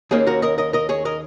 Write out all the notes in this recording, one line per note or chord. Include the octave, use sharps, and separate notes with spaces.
D#2 D#3 A#3 C#4 G#4
F#4 A#4
A#4 D#5
A#4 D#5
A#4 D#5
G#4 C#5
A#4 D#5